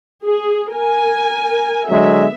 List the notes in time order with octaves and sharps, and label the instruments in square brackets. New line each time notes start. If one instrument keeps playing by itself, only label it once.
[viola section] G#4
A#4 G#5
[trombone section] D3 F#3 G#3 [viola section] B3 E5